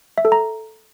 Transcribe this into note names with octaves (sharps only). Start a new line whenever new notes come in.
E5
A4
A#5